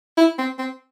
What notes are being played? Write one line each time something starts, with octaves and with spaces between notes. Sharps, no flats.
E4
C4
C4